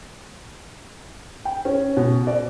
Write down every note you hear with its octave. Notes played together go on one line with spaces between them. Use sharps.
G5
C#4
B2
D5